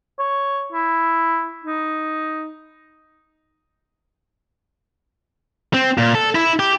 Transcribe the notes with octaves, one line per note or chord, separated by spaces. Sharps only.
C#5
E4
D#4
C4
A#2
A4
E4
G4